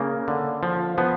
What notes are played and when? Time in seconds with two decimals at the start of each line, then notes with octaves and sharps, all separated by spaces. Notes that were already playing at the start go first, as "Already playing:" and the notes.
Already playing: C#3 A#3
0.28 D3
0.63 F3
0.98 F3 B3